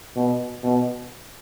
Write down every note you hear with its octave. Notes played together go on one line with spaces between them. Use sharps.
B2
B2